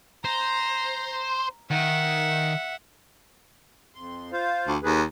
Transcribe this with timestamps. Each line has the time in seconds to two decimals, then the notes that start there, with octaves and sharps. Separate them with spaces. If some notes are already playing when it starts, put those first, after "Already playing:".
0.25 C5 A#5
1.71 D#3 E5 F#5
3.95 F2 C6
4.32 F4 C5 F5
4.67 D2
4.83 D#2 G#4 B4